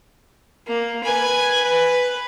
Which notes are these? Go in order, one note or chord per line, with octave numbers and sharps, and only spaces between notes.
A#3
B4 G#5
B4